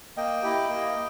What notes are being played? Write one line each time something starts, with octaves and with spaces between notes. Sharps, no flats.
A#3 D#5 G5
E4 G4
A#3